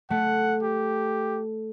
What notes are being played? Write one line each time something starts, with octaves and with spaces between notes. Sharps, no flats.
A3 F#5
G4